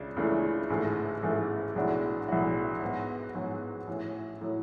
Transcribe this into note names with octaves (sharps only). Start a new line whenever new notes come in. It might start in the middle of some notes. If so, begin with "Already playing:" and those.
Already playing: C#2 C#3 D4
C#2 C#3 E3 A3 D4
A1 G#2 E3 A3
A1 G#2 E3 A3
B1 A2 G#3 D4 F#4
B1 A2 G#3 D4 F#4
G#2 F#3 B3 F#4
G#2 F#3 B3 F#4
A1 A2 F#3
A2 F#3